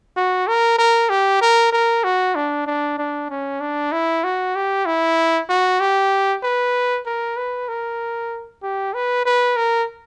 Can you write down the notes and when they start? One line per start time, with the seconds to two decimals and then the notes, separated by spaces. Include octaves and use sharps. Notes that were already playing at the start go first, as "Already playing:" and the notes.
0.16 F#4
0.47 A#4
0.78 A#4
1.09 G4
1.41 A#4
1.72 A#4
2.04 F#4
2.35 D4
2.66 D4
2.98 D4
3.30 C#4
3.60 D4
3.92 E4
4.24 F#4
4.55 G4
4.86 E4
5.49 F#4
5.80 G4
6.43 B4
7.06 A#4
7.37 B4
7.68 A#4
8.63 G4
8.94 B4
9.25 B4
9.56 A#4